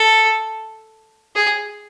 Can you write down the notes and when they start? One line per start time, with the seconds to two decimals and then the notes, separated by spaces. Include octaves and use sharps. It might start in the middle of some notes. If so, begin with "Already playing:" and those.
Already playing: A4
1.36 G#4